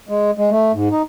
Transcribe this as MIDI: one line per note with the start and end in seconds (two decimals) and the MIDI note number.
0.09 0.31 56
0.38 0.50 56
0.51 0.72 57
0.74 0.89 44
0.92 1.02 63